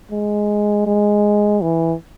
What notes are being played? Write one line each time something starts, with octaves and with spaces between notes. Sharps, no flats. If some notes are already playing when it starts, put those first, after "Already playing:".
G#3
G#3
E3